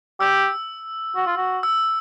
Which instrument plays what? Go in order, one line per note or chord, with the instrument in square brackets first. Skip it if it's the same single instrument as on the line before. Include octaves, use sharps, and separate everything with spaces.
[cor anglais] G4 [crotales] E6
[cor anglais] F#4
F4
F#4
[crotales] E6